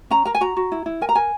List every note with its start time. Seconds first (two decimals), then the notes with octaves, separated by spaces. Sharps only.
0.10 C#4 A#5
0.25 A#4 A#5
0.35 G#5
0.41 F#4 A#5
0.57 F#4
0.72 E4
0.86 E4
1.01 A#4 G#5
1.09 A#5
1.15 A#4 G#5